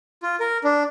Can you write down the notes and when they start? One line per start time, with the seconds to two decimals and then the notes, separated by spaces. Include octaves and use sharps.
0.23 F4
0.40 A#4
0.64 D4